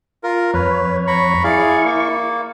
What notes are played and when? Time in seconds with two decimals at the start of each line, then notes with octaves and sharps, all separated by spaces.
0.23 F4 A#4
0.54 F2 B4 C#5
1.07 A#5 B5 C#6
1.44 E4 G#4 D5 F5 C#6
1.84 A#3